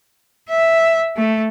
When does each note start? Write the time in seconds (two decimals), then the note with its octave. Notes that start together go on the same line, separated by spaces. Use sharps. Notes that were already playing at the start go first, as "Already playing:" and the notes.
0.49 E5
1.17 A3